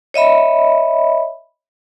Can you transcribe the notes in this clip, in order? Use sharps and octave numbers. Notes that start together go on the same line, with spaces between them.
C#5 D#5 E5 B5